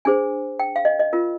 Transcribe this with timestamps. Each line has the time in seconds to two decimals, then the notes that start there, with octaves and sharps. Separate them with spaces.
0.05 D4 G#4 C5 G#5
0.59 G5
0.76 F5
0.85 D#5
1.00 D#5
1.13 F4 A#4